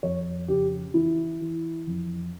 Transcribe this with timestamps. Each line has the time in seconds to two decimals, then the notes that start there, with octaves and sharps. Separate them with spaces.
0.03 F2 C#5
0.48 C#3 G4
0.94 E3 E4
1.41 E3
1.87 F2